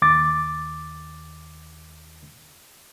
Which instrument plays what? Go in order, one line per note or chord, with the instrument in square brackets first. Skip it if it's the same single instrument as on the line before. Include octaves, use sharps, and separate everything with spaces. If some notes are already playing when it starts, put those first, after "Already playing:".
[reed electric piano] D#2 D6 A6